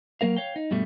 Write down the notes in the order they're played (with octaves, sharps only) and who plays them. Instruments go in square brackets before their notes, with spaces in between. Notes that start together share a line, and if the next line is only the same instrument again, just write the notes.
[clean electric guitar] F#3 A#3 A#4 F5
C#5 F5 G5
D#4
G2 B2 G3 A3